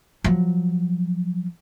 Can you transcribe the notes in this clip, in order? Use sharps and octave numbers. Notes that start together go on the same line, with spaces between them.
F3 F#3